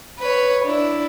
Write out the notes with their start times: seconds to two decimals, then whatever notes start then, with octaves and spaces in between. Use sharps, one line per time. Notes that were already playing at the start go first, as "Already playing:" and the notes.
0.19 B4 C#5
0.64 D4 E4